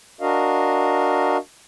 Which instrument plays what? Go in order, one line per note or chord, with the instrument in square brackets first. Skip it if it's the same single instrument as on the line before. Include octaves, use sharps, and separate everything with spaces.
[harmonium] D4 F#4 A#4 D#5 F5